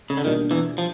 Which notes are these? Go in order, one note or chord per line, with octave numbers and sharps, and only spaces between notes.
C#3
D3
B2 D#3 G3 A#3 D4 F4
E2 E3
F3